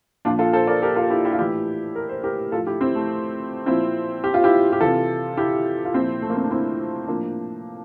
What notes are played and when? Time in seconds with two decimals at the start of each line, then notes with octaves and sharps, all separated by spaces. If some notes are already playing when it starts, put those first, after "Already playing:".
0.25 A#2 F3 D4 F4
0.39 F4 A4
0.53 A4 C5
0.67 A#4 D5
0.82 G4 A#4
0.96 F4 A4
1.10 E4 G4
1.25 E4 G4
1.32 F4
1.38 A2 E3 E4 G4
1.95 A#4
2.09 C5
2.24 G4 A#4
2.52 A2 F3 F4 A4
2.67 E4 G4
2.81 C4 E4
2.95 A3
3.66 A#2 F3 C4 E4
4.24 G4
4.34 F4
4.44 E4 G4
4.73 G4
4.81 C3 E3 F4 A4
5.37 E4 G4
5.85 F4
5.94 A#2 F3 C4 E4
6.22 A3
6.30 A#3
6.37 C4
6.44 D4
6.51 C4 E4
7.07 A2 F3 A#3 D4